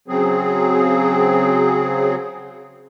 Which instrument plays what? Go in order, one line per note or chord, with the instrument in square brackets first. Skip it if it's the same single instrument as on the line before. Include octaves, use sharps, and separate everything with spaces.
[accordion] C#3 F#3 C4 G#4